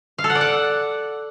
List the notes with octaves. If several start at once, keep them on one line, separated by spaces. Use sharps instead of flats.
F5
A4
F#5
D5
F#5